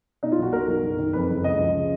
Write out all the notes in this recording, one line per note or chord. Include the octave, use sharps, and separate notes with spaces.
B2 D#4
F4
B1 F#4
B2 A#4
B1
F#1
D#3
F2 B4
F#1
C#2 D#5
F3
C#3